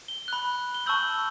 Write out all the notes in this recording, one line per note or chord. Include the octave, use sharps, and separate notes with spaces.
G7
B5 F#6
G7
A5 C#6 E6 G6 F#7